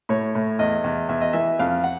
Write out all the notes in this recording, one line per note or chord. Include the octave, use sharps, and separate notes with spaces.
A2 C#5
A2
E2 D#5
E2
E2 E5
D#5
E3 E5
F2 F5
F#5